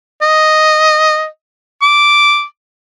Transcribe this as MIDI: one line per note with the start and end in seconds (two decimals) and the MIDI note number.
0.22 1.26 75
1.82 2.44 86